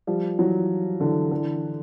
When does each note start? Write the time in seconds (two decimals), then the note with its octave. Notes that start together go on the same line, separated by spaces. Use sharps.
0.07 F3 G3
0.38 E3 F#3
1.00 D3 E3
1.31 D3 E3